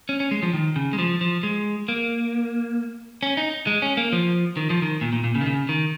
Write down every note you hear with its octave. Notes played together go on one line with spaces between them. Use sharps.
C#4
C#4
G#3
F3
D#3
C#3
G#3
F3
F3
G#3
A#3
C#4
D#4
G#3
C#4
A#3
F3
D#3
F3
D#3
A#2
A#2
A#2
C#3
D#3
C#3
D#3